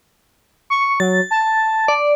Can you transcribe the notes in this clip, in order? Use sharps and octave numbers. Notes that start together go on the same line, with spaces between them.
C#6
F#3 A6
A5
D5